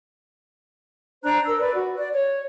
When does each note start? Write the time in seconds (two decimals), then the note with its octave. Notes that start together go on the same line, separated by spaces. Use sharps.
1.23 D4 C5 A#5 F#6
1.46 A#4 E6
1.60 B4 D5
1.74 F#4
1.97 D5
2.14 C#5